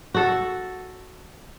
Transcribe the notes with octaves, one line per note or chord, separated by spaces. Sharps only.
F#4 A4